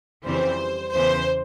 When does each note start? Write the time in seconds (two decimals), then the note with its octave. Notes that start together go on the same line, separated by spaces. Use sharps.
0.24 F2 C#3 E3 G3 C4 C5
0.92 E2 C#3 E3 C5